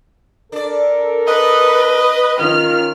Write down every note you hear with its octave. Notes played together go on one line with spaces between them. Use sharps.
D4 A4 A#4 D5
B4 D#5
D#3 C#4 F4 F6